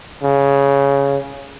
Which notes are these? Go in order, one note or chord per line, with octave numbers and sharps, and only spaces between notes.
C#3